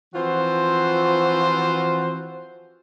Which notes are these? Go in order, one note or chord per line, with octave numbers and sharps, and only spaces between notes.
E3 F3 C4 F4 F#4 C5